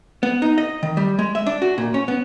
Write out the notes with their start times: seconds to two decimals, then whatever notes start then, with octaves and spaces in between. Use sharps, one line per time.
0.23 B3
0.42 D#4
0.58 D#5
0.83 D#3
0.97 G3
1.19 G#3
1.35 E5
1.47 D4
1.62 F#4
1.78 A#2
1.94 C#4
2.08 B3